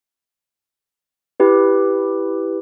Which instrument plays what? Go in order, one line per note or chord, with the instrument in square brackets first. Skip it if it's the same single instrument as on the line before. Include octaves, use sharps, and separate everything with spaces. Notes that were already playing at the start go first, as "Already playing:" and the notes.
[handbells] E4 G4 B4